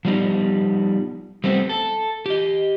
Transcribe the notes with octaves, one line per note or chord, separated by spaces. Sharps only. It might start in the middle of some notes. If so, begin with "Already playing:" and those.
F3 G3 B3 D#4
G3 A3 B3 C4 G4
A4
G4 D#5